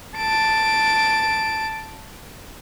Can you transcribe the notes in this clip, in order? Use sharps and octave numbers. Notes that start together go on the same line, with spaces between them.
A5 D7